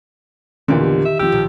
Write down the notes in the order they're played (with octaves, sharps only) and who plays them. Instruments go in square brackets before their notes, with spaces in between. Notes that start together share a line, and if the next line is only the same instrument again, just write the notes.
[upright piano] E2 A#2 D3 [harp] D#3 G4
[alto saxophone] E5
[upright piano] F3 E6 [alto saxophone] G4
[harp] B1 A#2